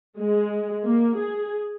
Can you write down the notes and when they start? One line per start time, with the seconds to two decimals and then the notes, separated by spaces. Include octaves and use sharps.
0.17 G#3
0.83 A#3
1.17 G#4